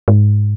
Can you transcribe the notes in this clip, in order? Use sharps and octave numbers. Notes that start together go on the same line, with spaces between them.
G#2